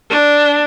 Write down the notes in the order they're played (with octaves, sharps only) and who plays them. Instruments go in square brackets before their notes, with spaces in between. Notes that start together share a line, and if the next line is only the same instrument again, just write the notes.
[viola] D4